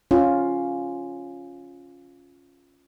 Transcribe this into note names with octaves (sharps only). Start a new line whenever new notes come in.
C#4 F4